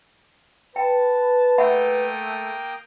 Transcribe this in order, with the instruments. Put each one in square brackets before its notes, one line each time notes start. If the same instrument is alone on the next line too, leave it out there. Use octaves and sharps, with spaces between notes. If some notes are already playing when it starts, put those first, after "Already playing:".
[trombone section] B4 [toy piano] G5 [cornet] A5
[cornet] A3 [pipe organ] A#3 G5 D#6 [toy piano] E5 F#5 B5